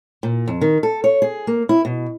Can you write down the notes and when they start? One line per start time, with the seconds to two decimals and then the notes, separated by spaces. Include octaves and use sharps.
0.23 A#2
0.48 F2
0.61 D#3
0.83 A4
1.04 C#5
1.22 G#4
1.47 A#3
1.69 E4
1.85 B2